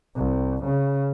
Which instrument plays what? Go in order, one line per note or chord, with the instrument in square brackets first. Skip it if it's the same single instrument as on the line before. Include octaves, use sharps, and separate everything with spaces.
[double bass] C2
C#3